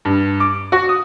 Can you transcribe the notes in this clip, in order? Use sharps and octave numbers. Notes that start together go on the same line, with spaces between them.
G2
D6
F#4
D#6